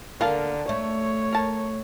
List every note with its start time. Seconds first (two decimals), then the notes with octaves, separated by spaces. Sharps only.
0.21 D3 A#3 A#4 F5 A5
0.69 A3 C#5
1.32 A#4 A5